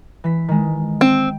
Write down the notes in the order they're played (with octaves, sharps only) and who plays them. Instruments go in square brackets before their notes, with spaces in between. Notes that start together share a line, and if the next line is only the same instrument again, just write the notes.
[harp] E3 B6
D#3 G#3
[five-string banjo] C4